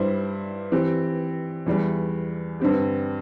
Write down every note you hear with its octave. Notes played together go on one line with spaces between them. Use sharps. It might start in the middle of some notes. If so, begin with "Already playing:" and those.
Already playing: G2 G3 E4 C5
E3 C4 G4
E2 E3 G3
G2 D3 C4 G4